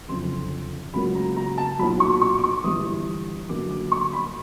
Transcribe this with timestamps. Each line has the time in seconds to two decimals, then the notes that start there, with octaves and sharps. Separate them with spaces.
0.08 F#1 F2 D3 C6
0.94 C#2 C#3 F#3 A#3 B5
1.15 A#5
1.36 A#5
1.58 A5
1.79 B1 A#2 F#3 B5
2.00 C#6
2.21 C#6
2.38 D6
2.44 C#6
2.64 G1 G2 E3 D#6
3.49 G1 F#2 D3 F#3 A#3 D6
3.71 D6
3.92 C#6
4.13 B5